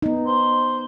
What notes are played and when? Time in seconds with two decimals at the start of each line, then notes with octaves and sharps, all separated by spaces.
0.02 B3 D#4
0.27 C5